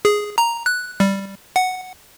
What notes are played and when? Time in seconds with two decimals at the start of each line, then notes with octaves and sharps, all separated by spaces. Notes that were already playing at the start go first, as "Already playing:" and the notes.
0.05 G#4
0.38 A#5
0.66 F#6
1.00 G3
1.56 F#5